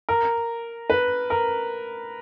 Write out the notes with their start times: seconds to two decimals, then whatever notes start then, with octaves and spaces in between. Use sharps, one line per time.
0.09 A#4
0.90 B4
1.30 A#4